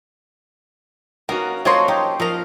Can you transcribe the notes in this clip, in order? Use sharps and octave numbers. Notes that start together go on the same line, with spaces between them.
A#3 B3 C#4 D#4 F#4 A#4
F3 A#3 F#4 A4 C#5 D#5 C6
D#4 G4 C#6
F3 A#4 D#5 F5 A#5